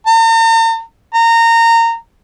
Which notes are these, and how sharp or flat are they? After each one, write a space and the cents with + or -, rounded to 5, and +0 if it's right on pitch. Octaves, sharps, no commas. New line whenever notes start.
A#5 -45
A#5 -20